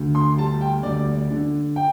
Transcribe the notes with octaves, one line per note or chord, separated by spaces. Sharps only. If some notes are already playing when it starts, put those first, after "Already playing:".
Already playing: D2 D3
C6
G3 A5
G5
D2 D5
D5
D3
G5